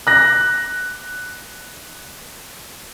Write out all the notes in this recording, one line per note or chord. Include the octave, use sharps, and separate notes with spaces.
F#6 A#6